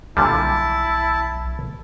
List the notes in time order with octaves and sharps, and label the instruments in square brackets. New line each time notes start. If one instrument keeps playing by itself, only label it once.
[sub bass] B1 [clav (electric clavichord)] A#2 D3 G3 [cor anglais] E4 [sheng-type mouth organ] A5